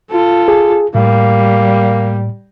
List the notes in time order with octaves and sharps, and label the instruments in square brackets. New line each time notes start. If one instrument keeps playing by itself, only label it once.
[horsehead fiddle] F4 A4
[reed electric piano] G#4
[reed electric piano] A2 [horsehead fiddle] G3 [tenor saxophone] A#3